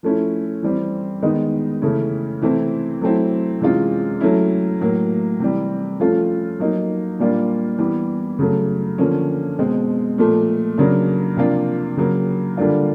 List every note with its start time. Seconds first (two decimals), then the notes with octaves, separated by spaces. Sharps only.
0.03 F3 A3 C#4 E4
0.62 E3 G3 C4
1.22 D#3 G#3 B3 D#4
1.82 C#3 E3 A3 C#4 E4
2.42 C3 E3 A3 C4 E4
3.01 F#3 A3 C4 E4
3.61 C3 E3 G#3 C#4 F4
4.21 F#3 A3 C#4 E4
4.81 A2 F#3 A#3
5.40 C3 E3 G3
6.00 F3 A3 C#4 F4
6.60 F#3 A#3 D#4
7.19 A#2 G3 A#3 D4 F4
7.79 E3 G3 B3
8.39 C#3 F#3 A3
8.98 D3 F3 A#3 C#4
9.59 B2 G#3 C4
10.18 A#2 F3 A3
10.78 C#3 F#3 A#3 D4
11.37 C3 F3 A#3 D4 F4
11.97 C#3 F#3 A#3
12.57 D3 G3 A#3 D4 F4